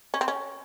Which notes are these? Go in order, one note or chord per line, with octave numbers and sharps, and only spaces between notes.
C#4
C4
C#4